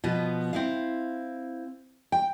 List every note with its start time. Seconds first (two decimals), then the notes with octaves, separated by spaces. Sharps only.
0.04 B2 F3 B3
0.53 C4 E4 F5
2.12 G5